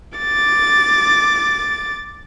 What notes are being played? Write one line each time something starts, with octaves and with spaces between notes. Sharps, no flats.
D6 A6